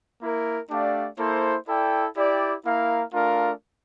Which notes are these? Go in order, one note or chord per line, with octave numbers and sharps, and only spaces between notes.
A#3 E4 A#4
A3 D4 G4 D5 F5
A#3 E4 A4 C5
E4 A4 D5 G5
E4 G4 D5 G5
A#3 E4 A#4 F5
A3 D4 F4 A#4 F5